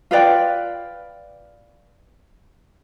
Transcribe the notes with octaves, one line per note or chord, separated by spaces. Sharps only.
F4 B4 D5 G5